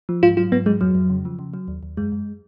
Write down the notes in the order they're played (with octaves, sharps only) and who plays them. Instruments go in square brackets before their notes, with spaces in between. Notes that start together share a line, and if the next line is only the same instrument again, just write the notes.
[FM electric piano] F3
G#2 F4
F#3 F4
G#2 B3
F#3 G#3
F2 F#3
F2
C#3
F3
C#3
F#3
D#2
D#2
F#2 G#3
F#2